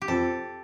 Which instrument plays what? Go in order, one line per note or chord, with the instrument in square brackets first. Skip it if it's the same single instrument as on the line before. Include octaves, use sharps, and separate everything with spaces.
[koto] G4
[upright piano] F2 [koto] A4